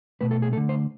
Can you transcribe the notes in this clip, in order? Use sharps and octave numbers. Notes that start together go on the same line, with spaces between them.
B2 A3 B4
A4
G#4
D3 A3 A4
C5